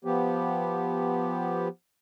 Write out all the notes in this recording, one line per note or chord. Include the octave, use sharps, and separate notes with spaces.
F3 B3 G4